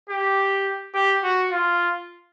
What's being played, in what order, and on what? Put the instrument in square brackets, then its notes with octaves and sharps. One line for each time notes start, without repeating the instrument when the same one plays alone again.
[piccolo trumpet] G4
G4
F#4
F4